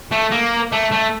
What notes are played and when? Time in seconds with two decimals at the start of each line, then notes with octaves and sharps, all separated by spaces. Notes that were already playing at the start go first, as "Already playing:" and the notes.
0.12 A3
0.31 A#3
0.72 A3
0.92 A3